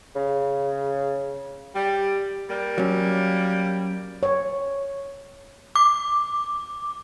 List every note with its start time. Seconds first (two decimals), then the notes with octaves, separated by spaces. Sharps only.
0.16 C#3
1.74 G3
2.48 G3 A#3
2.78 F#3 C#4
4.23 C#5
5.76 D6